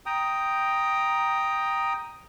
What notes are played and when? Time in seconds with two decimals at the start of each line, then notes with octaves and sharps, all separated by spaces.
0.06 G5 A#5 D#6